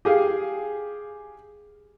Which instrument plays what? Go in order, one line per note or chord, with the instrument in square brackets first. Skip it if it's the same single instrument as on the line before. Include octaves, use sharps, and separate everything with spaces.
[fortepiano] G4 G#4 F5